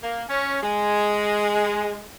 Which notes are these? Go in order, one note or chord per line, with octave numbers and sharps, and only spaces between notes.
A#3
C#4
G#3